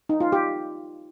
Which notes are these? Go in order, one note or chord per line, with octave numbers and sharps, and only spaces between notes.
D#4
F4
G4